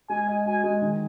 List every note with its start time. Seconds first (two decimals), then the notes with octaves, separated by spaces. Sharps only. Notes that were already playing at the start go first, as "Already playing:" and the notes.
0.10 G#3 G#5
0.28 D#5
0.46 F#4 G#5
0.64 G#3
0.82 D#3